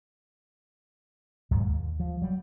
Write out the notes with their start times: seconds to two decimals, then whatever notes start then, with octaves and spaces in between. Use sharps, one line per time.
1.51 D#2 G#2 B2 F#3
1.67 D#2
2.00 F3
2.22 F#3 G3